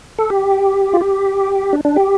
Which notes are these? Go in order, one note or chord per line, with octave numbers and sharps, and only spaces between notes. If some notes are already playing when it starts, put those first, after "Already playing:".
A4
G4
F4
G4
D4
D4
G4